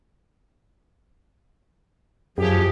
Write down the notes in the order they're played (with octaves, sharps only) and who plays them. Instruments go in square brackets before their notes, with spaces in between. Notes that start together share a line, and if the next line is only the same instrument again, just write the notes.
[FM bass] F#2 [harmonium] F3 [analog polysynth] G4 [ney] G#4